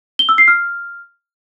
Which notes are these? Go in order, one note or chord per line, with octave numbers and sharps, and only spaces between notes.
G7
E6
C7
F6